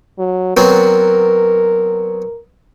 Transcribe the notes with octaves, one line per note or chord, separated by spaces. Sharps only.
F#3
F#3 B3 C4 A#4